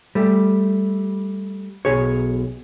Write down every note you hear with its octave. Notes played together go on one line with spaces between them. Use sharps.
G3 A3
B1 G#4 C#5